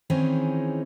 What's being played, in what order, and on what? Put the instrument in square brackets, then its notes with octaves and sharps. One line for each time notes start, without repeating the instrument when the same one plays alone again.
[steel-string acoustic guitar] D#3 E3 C4 C#4 D#4 G#4